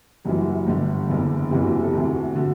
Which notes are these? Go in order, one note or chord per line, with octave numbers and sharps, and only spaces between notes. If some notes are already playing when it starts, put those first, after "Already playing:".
F#1 F#2 E3 G3
F#4
G1 G2 D3
F#1 E2 D3
F#1 E2 C3 E3 G4
F#4
G4
A4
D2 C3 E3 G4
F#4
D3 F#4